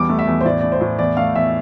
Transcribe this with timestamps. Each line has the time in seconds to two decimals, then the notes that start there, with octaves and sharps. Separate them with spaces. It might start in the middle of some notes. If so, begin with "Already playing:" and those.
Already playing: E2 G3 D6
0.09 A3
0.19 E5
0.27 E2
0.41 C5
0.45 A2 D5
0.61 A3 D5
0.72 C5
0.81 A2
0.99 E2 D5
1.17 A3 F5
1.35 E2 E5